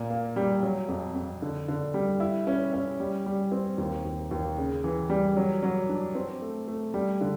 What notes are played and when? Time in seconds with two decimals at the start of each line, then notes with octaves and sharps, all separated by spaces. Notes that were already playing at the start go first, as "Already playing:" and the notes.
Already playing: A#2
0.10 A#3
0.36 G3
0.63 F#3
0.88 F2
1.15 F2
1.42 D3
1.68 D3
1.94 G3
2.20 E4
2.47 C#4
2.73 C#4
3.00 G3
3.26 G3
3.52 C4
3.78 D#2
4.05 D#2
4.31 D#2
4.57 C#3
4.84 E3
5.10 G3
5.37 F#3
5.63 F#3
5.89 D4
6.15 C4
6.42 A3
6.68 A3
6.94 G3
7.21 D3